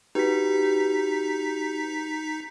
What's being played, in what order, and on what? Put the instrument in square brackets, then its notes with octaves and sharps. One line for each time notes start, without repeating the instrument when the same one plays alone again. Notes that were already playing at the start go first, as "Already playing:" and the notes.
[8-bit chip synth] D#4 B6 [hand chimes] F#4 G4 B4